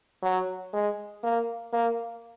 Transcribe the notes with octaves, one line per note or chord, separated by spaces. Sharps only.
F#3
G#3
A#3
A#3